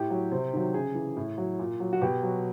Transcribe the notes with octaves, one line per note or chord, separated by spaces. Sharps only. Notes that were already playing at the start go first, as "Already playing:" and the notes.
Already playing: A2 G4
F#3
C3
D#3 F#3
C#3 G#4
E3
A2
F#3
A#2
F#3
F#4
B2 G4
F#3